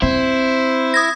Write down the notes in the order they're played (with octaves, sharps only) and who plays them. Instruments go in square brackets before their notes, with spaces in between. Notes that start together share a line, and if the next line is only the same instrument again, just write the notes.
[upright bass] C4 [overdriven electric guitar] E4 [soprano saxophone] C5
[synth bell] D#6 G#6 A#6